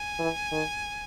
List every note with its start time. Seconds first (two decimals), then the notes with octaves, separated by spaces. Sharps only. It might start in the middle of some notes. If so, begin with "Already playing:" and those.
Already playing: G#5
0.19 E3
0.52 D#3